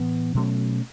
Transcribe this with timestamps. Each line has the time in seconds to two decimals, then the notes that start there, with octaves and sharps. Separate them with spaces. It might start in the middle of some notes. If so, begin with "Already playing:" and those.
Already playing: A2 E3 B3
0.35 B2 F#3 A3 C#4